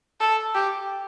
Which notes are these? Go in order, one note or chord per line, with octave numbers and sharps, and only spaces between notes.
A4
G4